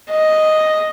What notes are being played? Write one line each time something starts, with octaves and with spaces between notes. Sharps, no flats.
D#5